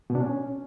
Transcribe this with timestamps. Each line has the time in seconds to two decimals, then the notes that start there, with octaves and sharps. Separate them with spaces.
0.10 B2
0.15 D4
0.20 C#4